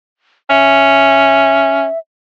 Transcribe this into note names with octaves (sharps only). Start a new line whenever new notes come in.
C#4 E5